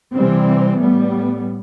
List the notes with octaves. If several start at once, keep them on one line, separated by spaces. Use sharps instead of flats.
C3 E3 G3 C4
A2 G3 B3